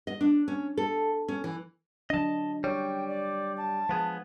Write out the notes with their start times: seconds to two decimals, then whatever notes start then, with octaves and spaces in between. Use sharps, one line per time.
0.07 D#5
0.21 D4
0.48 C#4
0.77 A4
1.28 C#4
1.44 E3
2.10 F#3 D4 D#5 A5
2.64 G3 C#5 G5
3.08 D5
3.57 A5
3.89 F3 G#3 B3 G#4